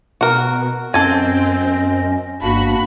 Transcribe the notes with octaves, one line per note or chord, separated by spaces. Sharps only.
B2 F#4 A#4
F#2 C4 C#4 A4 D#5 G#5
G1 G2 A#3 D4 F#4 B5